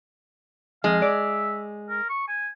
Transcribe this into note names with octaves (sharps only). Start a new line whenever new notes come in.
F2 G#3 F5
D5 E5
A#4
C#6
G#5